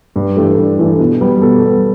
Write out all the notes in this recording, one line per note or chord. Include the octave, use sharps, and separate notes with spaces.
G2
E3 A3 D4 G4
G2
E3 A3 D4
B2
G3 B3
B2 A4
G3 B3